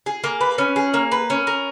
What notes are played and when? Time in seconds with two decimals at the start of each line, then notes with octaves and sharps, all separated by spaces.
0.06 G#4
0.24 A#3
0.41 B4
0.58 C#4
0.76 G#4
0.94 A#3
1.12 B4
1.30 C#4
1.47 A#4